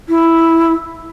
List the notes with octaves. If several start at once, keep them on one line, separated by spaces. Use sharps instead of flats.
E4